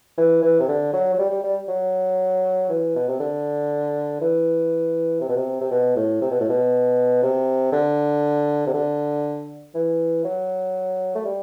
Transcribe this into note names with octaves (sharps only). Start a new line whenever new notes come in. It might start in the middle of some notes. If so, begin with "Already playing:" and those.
E3
E3
C3
D3
F#3
F#3
G3
G3
G3
F#3
E3
B2
C3
D3
E3
C3
B2
C3
C3
B2
A2
C3
B2
A2
B2
C3
D3
C3
D3
E3
F#3
A3
G3